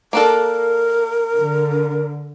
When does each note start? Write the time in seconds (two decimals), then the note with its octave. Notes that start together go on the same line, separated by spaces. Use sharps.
0.13 A#3 D4 A4 A#4
1.38 D3